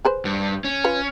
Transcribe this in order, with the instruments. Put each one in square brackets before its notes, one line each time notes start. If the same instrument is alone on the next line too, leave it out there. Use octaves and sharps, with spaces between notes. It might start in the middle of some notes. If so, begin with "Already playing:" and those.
[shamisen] G#4 B4 C5
[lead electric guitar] G2
C#4
[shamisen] F4 B4